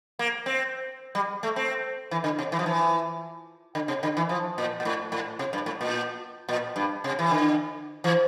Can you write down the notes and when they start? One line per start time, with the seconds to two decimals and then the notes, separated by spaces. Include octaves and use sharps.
0.19 A#3
0.46 C4
1.15 G3
1.43 A3
1.56 C4
2.11 E3
2.24 D3
2.39 C3
2.52 E3
2.59 F3
2.66 E3
3.75 D3
3.88 C3
4.03 D3
4.17 E3
4.29 F3
4.58 A#2
4.80 A#2
4.85 A2
5.12 A2
5.39 C3
5.53 G2
5.66 A2
5.81 A#2
6.49 A#2
6.76 G2
7.04 C3
7.19 E3
7.31 D3
8.04 E3